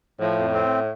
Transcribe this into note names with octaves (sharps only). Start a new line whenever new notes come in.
A2 F3
F2
C4